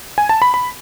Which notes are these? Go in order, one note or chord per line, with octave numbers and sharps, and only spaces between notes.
G#5
A5
B5
B5